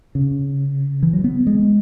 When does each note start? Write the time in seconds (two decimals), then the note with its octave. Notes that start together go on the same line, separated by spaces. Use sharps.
0.15 C#3
1.03 E3
1.13 F#3
1.24 B3
1.47 G#3